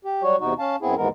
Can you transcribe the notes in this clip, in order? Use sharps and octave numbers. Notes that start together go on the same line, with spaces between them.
G4
F#3 G3 F#4 C#5
E2 C3 D#4 F#4
C#4 F5 A5
F#2 B3 C4 E4 G#4
D#2 G#2 E3 G#3 B3 A#4